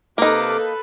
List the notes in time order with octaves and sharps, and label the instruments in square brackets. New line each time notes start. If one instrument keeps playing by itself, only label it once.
[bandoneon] C3 F5 D6 [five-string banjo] A#3 D#4 [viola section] A4 B4